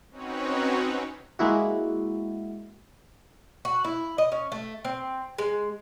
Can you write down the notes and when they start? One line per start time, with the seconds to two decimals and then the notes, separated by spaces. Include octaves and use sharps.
0.11 C4 C#4 D#4 F#4 B4 C#5
1.39 G#3 A#3 E4 F#4
3.65 F#4
3.84 E4
4.18 D#5
4.32 C#4
4.52 A3
4.85 C4
5.38 G#3